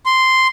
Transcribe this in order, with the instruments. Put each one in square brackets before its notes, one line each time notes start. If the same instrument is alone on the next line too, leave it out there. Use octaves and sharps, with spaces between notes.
[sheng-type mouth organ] C6